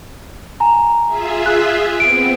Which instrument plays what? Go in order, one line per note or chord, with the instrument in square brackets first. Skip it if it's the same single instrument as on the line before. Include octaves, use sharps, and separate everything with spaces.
[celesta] G#5 A#5
[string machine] F4 G#4 E5
[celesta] F#6
[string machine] B3 C4 [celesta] D7